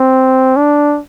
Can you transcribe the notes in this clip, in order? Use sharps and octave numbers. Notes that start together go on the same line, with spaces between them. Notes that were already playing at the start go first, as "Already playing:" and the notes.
Already playing: C4
D4